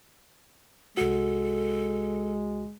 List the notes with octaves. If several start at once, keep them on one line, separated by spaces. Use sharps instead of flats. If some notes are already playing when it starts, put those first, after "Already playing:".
C2 G#3 F#4 A4